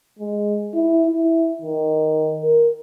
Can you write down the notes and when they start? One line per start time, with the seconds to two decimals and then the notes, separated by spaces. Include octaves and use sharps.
0.19 G#3
0.74 E4
1.06 E4
1.62 D#3
2.41 A#4